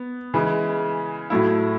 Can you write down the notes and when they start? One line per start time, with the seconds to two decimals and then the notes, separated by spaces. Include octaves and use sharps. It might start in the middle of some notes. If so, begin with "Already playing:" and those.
Already playing: B3
0.34 C#3 E3 G#3
1.30 A2 F#3 A3 E4